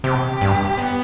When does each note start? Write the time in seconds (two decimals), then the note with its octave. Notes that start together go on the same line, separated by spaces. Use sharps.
0.04 C3 G4
0.41 G2
0.77 B3